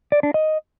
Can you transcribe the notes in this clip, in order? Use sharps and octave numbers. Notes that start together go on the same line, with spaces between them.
D5
D4
D#5